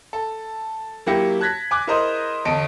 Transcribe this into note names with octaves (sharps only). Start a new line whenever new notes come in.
A4
F#3 A#3 E4 G4 A#6 C#7
A5 F#6 G#6 A#6 B6
G#5 D6 F#6
E4 G#4 A#4 C5 D#5 A#5
G1 E2 D#5 A5 C#7 D7